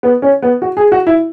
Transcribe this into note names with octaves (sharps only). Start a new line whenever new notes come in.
B3
C#4
B3
F#4
G#4
F#4
E4